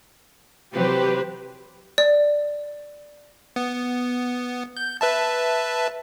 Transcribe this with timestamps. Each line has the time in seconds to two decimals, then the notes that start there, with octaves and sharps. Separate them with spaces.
0.73 C3 E3 F#3 G4 B4 C5
1.98 D5
3.56 B3
4.77 G6
5.01 B4 E5 A5